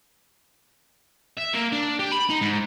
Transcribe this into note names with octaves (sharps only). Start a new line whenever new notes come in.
E5
A#3
D4
G4
B5
D#4
G#2